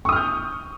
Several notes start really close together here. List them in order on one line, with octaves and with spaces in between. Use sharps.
C#6 D#6 F6 G6